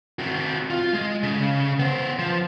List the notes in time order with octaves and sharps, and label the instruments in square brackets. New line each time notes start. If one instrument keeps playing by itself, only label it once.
[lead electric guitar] C4 F#4
F4
G#3
C#3
B3 C5
F3